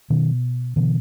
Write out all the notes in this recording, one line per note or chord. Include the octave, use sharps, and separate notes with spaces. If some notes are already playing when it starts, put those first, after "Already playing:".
B2 D#3
B2 D3 E3